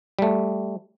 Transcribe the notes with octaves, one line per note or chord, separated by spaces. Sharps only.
G3 A3